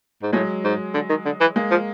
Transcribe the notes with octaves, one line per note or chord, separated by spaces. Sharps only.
G#2
A2 F#3 G#3
G#2
D3
D#3
D3
E3
G#3 A#3
F3